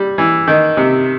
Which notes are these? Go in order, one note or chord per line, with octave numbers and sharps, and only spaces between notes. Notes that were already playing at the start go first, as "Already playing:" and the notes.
Already playing: G3
E3
D#3
C3